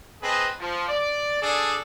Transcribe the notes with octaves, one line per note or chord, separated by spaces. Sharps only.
C4 G#4 B4 D#5 A5
F3
D5
D4 G#4 A4 D5